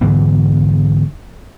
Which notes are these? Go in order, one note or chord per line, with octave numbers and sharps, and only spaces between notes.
G#2 D3 E3 B3